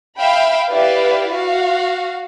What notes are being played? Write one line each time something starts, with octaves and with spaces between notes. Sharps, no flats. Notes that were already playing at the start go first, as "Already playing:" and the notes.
E5 F5 G5 B5
E4 G4 B4 D5 E5 F5
F#4 F5